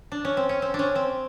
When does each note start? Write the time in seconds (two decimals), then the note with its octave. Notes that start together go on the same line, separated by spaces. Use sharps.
0.12 D4
0.25 C#4
0.37 C4
0.49 C#4
0.62 C4
0.74 D4
0.79 C#4
0.96 C4